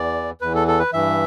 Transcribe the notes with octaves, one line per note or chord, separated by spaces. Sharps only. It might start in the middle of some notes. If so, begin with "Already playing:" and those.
Already playing: E2 E3 D5
E2 E3 B4
A4
A4
B4
G2 E3 E5